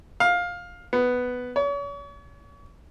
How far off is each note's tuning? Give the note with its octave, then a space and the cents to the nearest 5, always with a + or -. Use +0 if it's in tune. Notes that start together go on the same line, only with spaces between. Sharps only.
F5 +15
B3 +5
C#5 +40